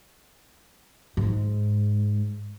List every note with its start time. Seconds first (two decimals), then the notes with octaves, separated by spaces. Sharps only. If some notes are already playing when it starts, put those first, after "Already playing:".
1.17 G#2